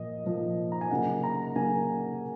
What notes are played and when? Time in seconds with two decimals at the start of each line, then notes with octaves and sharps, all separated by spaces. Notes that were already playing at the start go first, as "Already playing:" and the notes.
Already playing: A#2 F3 A#3 D#5
0.25 A#2 F3 A#3
0.72 A#5
0.81 G#5
0.90 C#3 F#3 A#3 F#5
1.23 A#5
1.56 C#3 F#3 A#3 G#5